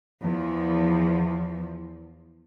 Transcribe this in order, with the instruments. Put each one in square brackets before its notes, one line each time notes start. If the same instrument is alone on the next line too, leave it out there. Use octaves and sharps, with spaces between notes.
[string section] E2 F3